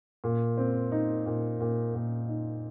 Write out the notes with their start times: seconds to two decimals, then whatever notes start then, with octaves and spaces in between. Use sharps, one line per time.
0.24 A#2
0.57 C4
0.92 D#4
1.26 A#2
1.61 A#2
1.95 A#2
2.28 D#4